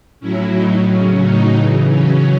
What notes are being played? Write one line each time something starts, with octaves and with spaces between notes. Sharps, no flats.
A2 F#3 C#4 E4
A2 F#3 D#4
C#3 F#3 C#4
A2 F#3 D#4
C#3 E3
C#3 F#3 C#4